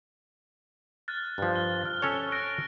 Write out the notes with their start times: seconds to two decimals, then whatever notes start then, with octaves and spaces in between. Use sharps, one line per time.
1.08 F6 F#6 A6
1.38 G2 F3
1.53 F#6 G7
1.81 F6 A6
2.02 C#4 A4 C#5
2.32 F#6 A#6 D7